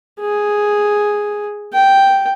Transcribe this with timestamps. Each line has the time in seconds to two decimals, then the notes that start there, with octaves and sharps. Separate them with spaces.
0.20 G#4
1.73 G5